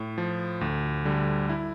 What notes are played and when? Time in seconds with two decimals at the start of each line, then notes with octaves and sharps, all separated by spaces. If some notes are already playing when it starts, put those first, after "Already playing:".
Already playing: A2
0.18 F3
0.61 D2
1.05 D3 G3
1.49 E4